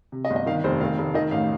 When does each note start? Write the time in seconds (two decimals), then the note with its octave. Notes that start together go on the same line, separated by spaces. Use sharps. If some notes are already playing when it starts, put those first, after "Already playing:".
0.12 C3
0.25 D#5
0.30 G1
0.36 D#5
0.46 D#3 F5
0.64 F1 C5
0.81 D#3 F5
0.98 F1
1.14 D#3 D#5
1.31 A1 F5